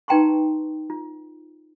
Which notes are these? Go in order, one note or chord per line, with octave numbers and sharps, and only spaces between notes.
D#4 B4 G5 A#5 C6 C#6
F4